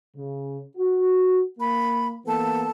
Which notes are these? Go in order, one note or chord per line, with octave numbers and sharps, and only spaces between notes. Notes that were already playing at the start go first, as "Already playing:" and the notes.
C#3
F#4
A#3 B5
E3 A#3 B3 A4 A5